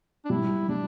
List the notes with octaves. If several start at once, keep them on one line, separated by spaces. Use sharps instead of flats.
D4
G3 E4
G3 D4